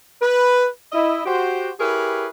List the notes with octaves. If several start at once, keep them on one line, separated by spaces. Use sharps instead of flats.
B4
E4 D#5 E5
F#4 G4 C5
E4 G4 G#4 A#4 B4 C#5